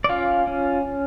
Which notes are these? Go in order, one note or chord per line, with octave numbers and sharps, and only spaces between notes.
D5
C#4 F4 F5
C#4